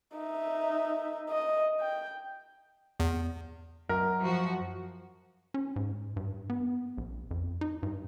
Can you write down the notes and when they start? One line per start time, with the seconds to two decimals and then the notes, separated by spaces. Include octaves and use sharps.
0.16 D#4 E5
1.30 D#5
1.80 G5
3.00 E2
3.89 F#2 A#4
4.23 F3 F#4
5.54 C#4
5.76 G#2
6.16 G2
6.50 B3
6.98 A#1
7.31 F2
7.61 D#4
7.83 G2